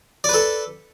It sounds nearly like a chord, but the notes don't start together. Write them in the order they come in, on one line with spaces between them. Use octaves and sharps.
D5 B4 A4